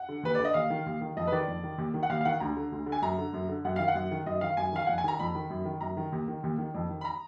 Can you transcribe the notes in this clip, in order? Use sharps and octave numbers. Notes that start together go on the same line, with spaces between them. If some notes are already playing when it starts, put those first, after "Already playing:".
Already playing: F#5
D3
D#2 B4
D3 D5
D#5
D#2 F5
D#3
D#2
D#3
F2 D#5
B4
D#3 D5
F2
D#3
D#2
D#3
F#5
D#2 F5
F5
D#3 F#5
D2 A#5
D3
D2
D3
G#5
F#2 A#5
D3
F#2
D3
F#2 F#5
D#3 F5
F#5
F#2
D#3
F#2 D#5
D#3 F5
F#2 G#5
D#3 F5
F2 F#5
G#5
D#3 A#5
F2 B5
D#3
F#2
D#3
F#2 A#5
D#3
D#2
D#3
D#2
D#3
F2
D#3
B5
A#5